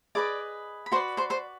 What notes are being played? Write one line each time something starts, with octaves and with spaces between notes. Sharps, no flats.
G#4 B4 D5 D#5 D6
B5
F#4 B4 C5 D5 C6
C5 C6
C5 C6